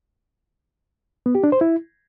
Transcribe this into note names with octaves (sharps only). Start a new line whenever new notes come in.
B3
G4
D4
C5
E4